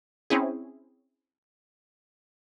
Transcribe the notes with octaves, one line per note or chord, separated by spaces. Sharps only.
C4 C#4 E4 G#4